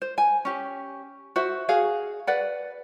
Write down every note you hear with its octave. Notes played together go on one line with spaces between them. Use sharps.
C5
G#5
C#4 G4
F#4 C5 E5
F#4 G#4 F5
B4 D5 F#5